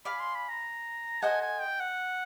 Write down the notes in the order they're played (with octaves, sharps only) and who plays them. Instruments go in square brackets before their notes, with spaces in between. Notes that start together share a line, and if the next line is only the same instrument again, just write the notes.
[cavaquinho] D5 F5 G#5 [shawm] B5
[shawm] C6
B5
A#5
[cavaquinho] A4 C5 D#5 F#5 [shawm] G#5
[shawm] G#5
G5
F#5